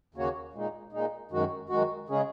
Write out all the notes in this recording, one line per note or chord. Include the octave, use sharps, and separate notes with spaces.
D#2 C#3 A#3 F#4 C#5
A#2 G#3 D#4
A#2 G#3 D#4
F#2 D#3 G#3 F#4
F#2 D#3 G#3 F#4
C#3 G#3 C#4 G#4